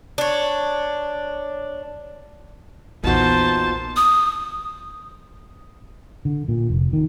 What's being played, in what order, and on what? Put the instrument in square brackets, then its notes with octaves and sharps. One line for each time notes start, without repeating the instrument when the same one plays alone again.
[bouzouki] D4 C#5
[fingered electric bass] A#1 E2 [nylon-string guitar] A#2 D#4 F#4 [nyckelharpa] B3 C5 [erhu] A5
[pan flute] D#6
[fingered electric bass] D3
A#2
F1
D#3